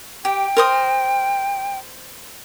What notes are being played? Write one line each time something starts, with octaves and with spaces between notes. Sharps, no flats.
G4 G5
A#4 C5 D#6